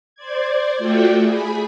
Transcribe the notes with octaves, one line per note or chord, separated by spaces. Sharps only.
C5 D5 G#6
A3 F4 F#4 D5 E5 G5
G#4 B5